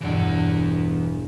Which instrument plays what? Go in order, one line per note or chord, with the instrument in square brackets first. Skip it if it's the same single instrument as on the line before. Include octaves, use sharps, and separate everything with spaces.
[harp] E1 G2 D7 [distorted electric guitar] E3 F#5